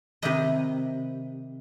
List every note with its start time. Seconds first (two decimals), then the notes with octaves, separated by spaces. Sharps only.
0.22 C3 D#3 E4 G4 B4 D#5